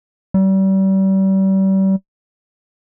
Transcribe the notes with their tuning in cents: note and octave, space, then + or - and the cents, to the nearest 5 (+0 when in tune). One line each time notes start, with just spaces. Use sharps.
G3 -35